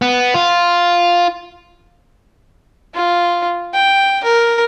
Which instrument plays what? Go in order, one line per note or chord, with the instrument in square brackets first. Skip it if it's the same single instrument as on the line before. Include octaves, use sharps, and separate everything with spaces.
[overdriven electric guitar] B3
F4
[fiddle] F4
G5
A#4